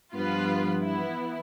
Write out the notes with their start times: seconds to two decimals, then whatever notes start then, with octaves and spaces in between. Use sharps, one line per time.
0.13 G2 F3 B3 F4 B4
0.81 E3 B3 E4